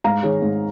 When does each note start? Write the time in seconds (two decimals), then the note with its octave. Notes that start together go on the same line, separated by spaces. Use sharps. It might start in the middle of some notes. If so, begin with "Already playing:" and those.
0.04 G#2 F5 A#5
0.23 D#3 G#4 C#5
0.42 G#2